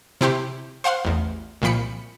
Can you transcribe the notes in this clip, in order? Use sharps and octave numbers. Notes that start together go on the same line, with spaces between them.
C3 E4 G4 C6
C5 F5 F#5 C6
A1 E2
C2 A#2 F3 B5 C#7